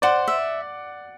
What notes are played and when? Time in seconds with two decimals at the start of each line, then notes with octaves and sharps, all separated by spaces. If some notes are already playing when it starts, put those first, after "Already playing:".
0.02 C5 D5 F#5
0.28 E5